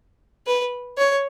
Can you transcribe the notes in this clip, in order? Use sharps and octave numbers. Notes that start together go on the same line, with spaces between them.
B4
C#5